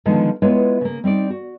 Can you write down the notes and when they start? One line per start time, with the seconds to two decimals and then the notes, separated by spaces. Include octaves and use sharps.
0.06 D3 D#3 F3 G#3 B3
0.42 G#3 B3 E4 F4 B4 C#5
0.81 C#3 A#3
1.04 G3 C4 D#4 D5
1.30 F#4